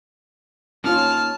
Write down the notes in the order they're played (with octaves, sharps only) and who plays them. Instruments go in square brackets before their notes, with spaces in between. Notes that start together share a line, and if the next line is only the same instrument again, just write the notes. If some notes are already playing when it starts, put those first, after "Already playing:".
[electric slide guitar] A#3 D#4 C#5 [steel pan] C#4 F4 [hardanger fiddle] A5 [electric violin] F6